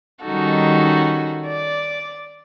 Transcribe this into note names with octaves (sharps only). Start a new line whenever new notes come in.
D#3 G3 C#4 D#4 F#4 A4
D5